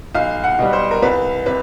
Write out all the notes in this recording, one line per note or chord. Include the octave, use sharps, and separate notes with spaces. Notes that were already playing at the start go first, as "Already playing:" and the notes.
B1 F5
F#5
B2 G3
C5
A#4
C2 B4
C3 B4